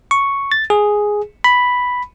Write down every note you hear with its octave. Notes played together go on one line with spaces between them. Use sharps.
C#6
A6
G#4
B5